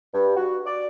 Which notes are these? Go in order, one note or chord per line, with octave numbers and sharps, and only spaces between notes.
G2
F#4
D5